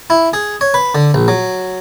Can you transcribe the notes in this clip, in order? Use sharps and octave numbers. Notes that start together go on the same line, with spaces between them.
E4
G#4
C#5
B4
D3
A#1
F#3